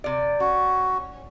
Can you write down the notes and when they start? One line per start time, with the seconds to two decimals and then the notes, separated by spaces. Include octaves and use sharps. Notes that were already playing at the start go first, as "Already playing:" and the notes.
0.04 C3 D5
0.40 C#4 F#4